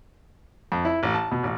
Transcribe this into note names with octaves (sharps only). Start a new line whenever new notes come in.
F2
E4
A1
A5
B2
A1